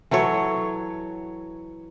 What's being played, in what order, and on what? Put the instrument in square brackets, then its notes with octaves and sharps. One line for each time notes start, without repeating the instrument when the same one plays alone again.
[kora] E3 F#3 A4 C#5